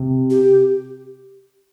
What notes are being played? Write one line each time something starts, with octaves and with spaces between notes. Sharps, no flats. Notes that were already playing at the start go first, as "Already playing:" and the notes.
Already playing: C3
G4